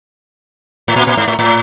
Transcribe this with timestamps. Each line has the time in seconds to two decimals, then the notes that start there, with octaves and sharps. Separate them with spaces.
0.88 A2
0.96 A#2
1.07 A#2
1.17 G#2
1.28 A2
1.39 A2